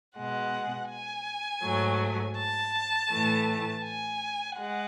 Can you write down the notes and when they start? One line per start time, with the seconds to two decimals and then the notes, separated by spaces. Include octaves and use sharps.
0.17 B2 G#3 F#5
0.90 G#5
1.63 G#2 F#3 A3
2.37 A5
3.10 A2 E3 A3
3.84 G#5
4.56 G#3 F#5